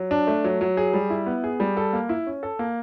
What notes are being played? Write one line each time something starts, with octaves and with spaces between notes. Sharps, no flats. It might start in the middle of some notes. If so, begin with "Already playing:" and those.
Already playing: F#3
D4
A3
F#3
F#3
G#4
G3
E4
B3
G#4
G3
A4
A#3
E4
C#4
A4
A#3